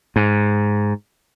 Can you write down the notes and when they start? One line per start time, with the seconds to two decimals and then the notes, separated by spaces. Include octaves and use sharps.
0.16 G#2